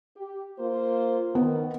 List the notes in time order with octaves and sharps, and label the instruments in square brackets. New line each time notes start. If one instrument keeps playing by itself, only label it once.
[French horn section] G4
A#3 F4 C5
[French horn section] D#3 [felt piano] B3